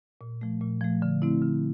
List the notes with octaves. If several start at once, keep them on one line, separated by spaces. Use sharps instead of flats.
A#2
F3 A3
A#2
F3 A3
D3
A3 C4 E4
D3